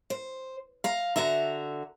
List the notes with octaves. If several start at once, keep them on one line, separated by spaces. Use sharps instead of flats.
C5
F5 A#5
D3 F#4 E5 A#5